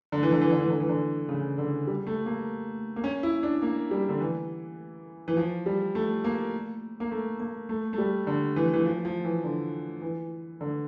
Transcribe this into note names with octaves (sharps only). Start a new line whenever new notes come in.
D3
E3
D3
E3
D3
E3
D3
E3
D3
C#3
D3
G3
A3
A#3
A#3
C#4
E4
D4
A#3
G3
D3
E3
E3
F3
G3
A3
A#3
A#3
A3
A#3
A3
A3
G3
D3
E3
E3
F3
F3
E3
D3
E3
D3